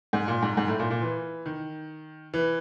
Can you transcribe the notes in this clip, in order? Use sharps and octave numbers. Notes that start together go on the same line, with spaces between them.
G#2
A#2
G#2
G#2
A2
A#2
A#2
E3
D#3
E3